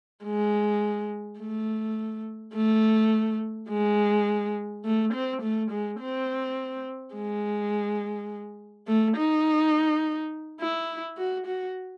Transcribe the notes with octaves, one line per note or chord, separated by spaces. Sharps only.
G#3
A3
A3
G#3
A3
C4
A3
G#3
C4
G#3
A3
D#4
E4
F#4
F#4